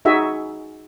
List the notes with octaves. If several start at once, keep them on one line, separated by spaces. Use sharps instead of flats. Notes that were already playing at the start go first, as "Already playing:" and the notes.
D#4 F#4 G#4 E5 G#5